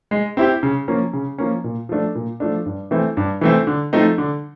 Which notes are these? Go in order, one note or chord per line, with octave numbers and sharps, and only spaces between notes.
G#3
C4 E4 G4
C#3
F3 A#3 C#4
C#3
F3 A#3 C#4
A#2
F3 A3 D4
A#2
F3 A3 D4
G2
E3 A3 C4 E4
G2
E3 A3 C4 E4
D3
F3 A3 C4 D#4
D3